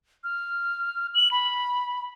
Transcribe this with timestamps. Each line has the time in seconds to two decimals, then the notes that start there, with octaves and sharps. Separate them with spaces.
0.24 F6
1.15 F#7
1.32 B5